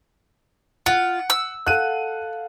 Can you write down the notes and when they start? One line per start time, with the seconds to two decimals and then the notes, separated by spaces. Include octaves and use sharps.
0.86 F4 F#5
1.30 E6
1.67 A4 F5 F#5 F#6 D#7